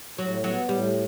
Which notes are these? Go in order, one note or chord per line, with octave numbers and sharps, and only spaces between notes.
A2 F#3
F#3 B3
A2 G3